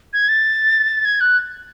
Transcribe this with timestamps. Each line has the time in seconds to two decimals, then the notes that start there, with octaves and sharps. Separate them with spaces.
0.13 G#6
0.29 A6
1.05 G#6
1.21 F#6